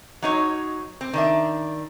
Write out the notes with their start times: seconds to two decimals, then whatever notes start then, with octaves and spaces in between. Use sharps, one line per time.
0.22 F#3 D#4 C#5
1.01 C4
1.13 D#3 D4 E5